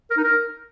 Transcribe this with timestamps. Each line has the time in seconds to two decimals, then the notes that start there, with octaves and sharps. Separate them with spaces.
0.10 A#4
0.17 D#4
0.24 A#4